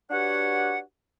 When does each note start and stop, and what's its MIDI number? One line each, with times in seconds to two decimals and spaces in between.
0.11 0.79 62
0.11 0.79 66
0.11 0.79 67
0.11 0.79 71
0.11 0.79 73
0.11 0.79 78